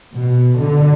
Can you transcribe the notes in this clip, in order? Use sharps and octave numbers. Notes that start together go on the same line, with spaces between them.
B2
D3